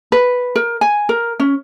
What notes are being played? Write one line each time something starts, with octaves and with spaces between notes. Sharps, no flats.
B4
A#4
G#5
A#4
C#4